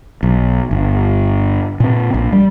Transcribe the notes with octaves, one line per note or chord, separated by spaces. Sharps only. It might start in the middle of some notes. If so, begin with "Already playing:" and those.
B1
G1
A#2 C4
A#1
G3